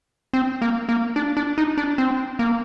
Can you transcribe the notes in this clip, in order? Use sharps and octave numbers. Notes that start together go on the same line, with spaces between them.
C4
A#3
A#3
D4
D4
D#4
D4
C4
A#3